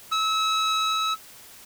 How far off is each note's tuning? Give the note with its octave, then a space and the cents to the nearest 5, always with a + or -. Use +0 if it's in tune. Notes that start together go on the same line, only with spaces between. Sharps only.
E6 -30